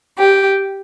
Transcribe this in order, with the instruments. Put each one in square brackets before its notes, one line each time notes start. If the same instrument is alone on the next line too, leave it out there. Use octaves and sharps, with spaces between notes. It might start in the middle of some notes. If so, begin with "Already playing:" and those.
[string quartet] G4